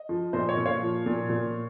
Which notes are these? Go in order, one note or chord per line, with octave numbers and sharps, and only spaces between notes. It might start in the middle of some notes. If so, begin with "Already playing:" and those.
Already playing: D#5
F3
A#2 C5 D#5
C#5
A#2
C#5 F5
F3
A#2
A#2